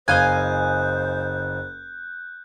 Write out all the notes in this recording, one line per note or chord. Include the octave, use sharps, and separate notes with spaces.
F#1 C5 D#5 F5 G#5 F#6 G6